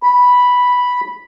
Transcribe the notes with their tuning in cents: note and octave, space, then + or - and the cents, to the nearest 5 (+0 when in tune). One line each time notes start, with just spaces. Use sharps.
B5 -5